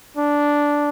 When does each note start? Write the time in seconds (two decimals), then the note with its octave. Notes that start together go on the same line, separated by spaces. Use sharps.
0.17 D4